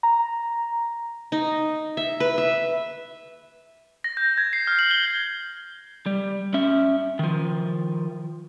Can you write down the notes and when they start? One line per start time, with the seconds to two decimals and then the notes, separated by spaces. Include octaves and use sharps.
0.03 A#5
1.32 D#4
1.97 E5
2.20 B4
2.38 E5
4.04 A#6
4.17 G6
4.38 G#6
4.53 C7
4.67 F6
4.79 F#7
4.91 G7
6.06 G3
6.54 C#4 E5
7.19 D#3 F3